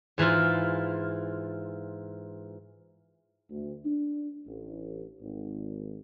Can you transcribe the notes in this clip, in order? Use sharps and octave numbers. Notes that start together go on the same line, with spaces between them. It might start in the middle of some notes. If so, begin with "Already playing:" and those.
G#2 E3 E4 F4
D2
D4
A1
G#1